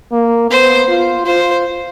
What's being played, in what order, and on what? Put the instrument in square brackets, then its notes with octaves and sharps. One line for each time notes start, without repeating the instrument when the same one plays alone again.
[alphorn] A#3
[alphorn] B3 [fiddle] C5
[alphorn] F4
[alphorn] F4 [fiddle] C5